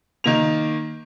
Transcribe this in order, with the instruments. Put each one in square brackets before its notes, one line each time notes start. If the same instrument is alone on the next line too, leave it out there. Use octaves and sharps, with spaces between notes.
[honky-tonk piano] D#3 A#3 F7